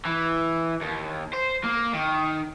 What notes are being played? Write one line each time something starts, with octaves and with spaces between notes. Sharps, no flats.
E3
D#2
C5
A#3
D#3